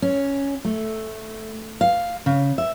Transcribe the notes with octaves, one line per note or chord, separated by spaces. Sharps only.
C#4
A3
F5
C#3
E5